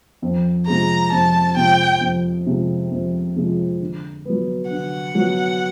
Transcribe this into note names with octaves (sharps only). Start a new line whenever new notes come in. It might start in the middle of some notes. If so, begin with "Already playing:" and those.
F2
C3 F3 G#3 A#5
F2 A5
C3 F3 G#3 G5
F2
C3 F3 G#3
F2
C3 F3 G#3
D3
F#3 B3
D3 F#5
F#3 B3